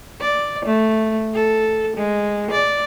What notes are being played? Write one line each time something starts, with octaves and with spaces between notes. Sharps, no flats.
D5
A3
A4
G#3
D5